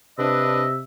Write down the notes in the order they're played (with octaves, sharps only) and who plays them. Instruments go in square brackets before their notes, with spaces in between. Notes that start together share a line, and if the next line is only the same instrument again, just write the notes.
[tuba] C3 [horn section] D4 B4 [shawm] D#5 [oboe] E5